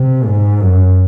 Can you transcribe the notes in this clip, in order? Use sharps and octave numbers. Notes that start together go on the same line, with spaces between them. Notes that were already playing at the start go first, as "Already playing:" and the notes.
Already playing: C3
G#2
F#2